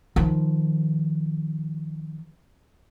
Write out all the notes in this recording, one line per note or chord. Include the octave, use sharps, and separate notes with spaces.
D#3 F3